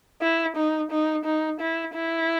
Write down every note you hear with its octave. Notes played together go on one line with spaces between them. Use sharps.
E4
D#4
D#4
D#4
E4
E4